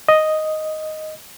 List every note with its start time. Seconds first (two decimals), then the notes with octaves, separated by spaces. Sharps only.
0.08 D#5